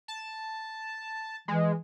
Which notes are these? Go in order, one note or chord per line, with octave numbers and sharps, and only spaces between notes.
A5
E3 G#3